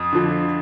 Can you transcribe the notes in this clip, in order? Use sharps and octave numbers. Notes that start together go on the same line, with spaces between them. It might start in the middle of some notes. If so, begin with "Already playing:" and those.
Already playing: F2 D#6
D3 F3